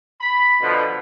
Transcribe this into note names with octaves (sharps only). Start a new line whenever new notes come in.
B5
B2 D3 F3